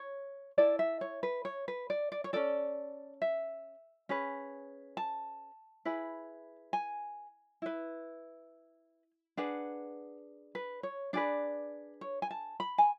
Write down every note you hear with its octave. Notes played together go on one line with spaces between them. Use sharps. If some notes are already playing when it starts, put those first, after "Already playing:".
Already playing: C#5
E4 A4 D5
E5
C#5
B4
C#5
B4
D5
D5
C#5
C#4 F#4 A4 D5
E5
C#4 G#4 B4
A5
E4 G#4 B4
G#5
E4 B4
D4 G#4 B4 F#5
B4
C#5
D4 G#4 B4 D5
C#5
G#5
A5
B5
G#5